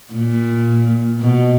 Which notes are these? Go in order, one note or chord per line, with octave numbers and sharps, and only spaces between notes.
A#2
B2